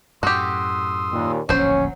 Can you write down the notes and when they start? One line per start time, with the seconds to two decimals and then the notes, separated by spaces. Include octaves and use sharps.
0.23 F#2 A2 F#4 G4 C6 D#6 E6
1.12 D#2 A#2
1.49 D1 A#1 E2 F#3 C#4 C5 C#5